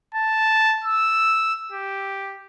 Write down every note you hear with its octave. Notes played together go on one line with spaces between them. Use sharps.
A5
E6
G4